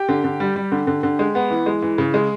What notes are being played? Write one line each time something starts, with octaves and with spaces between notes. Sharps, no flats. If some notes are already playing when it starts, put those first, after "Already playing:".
Already playing: G4 G5
D3
D3
G3
G3
D3
D3
D3
G#3
B3
E3
G#3
E3
C#3
G#3